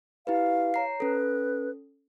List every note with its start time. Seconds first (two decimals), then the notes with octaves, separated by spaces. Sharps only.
0.27 E4 G4 B4 F5
0.74 C#5 A#5 C7
1.00 C#4 A4 B4